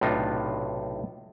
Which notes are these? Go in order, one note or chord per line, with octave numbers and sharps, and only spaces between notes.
B1 A2 C3 D4 D#4 F4